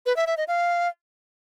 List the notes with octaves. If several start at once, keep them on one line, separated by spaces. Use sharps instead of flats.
B4
E5
E5
D#5
F5